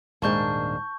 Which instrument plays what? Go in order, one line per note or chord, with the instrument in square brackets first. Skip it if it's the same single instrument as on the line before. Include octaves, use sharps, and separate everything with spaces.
[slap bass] D#1 [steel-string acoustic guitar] G#2 [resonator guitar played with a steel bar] A#3 D4 G#4 [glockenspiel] A5 C#6 G6